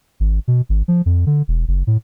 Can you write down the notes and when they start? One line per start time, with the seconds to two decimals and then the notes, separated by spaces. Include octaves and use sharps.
0.20 G#1
0.48 B2
0.69 G#1
0.88 F3
1.06 F2
1.26 D3
1.48 E1
1.68 F#1
1.87 A2